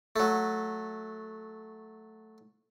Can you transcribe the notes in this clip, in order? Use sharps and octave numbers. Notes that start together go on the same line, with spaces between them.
F#3 A3